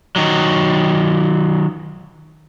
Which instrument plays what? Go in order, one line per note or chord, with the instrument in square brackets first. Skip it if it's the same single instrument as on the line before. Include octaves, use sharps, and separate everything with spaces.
[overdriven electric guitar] D#3 F#3